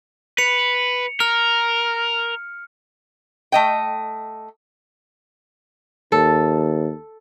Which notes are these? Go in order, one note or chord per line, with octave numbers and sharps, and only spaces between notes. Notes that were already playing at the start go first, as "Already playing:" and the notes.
B4 C#7 F7
A#4 F6
A3 D#5 G5
D#2 A4